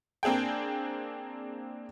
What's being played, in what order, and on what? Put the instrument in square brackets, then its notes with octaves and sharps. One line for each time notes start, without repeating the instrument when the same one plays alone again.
[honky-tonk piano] A#3 C4 D4 G#4 G5